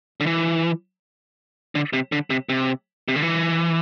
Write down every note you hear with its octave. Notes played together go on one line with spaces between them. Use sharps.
D3
E3
D3
C3
D3
C3
C3
C3
D3
E3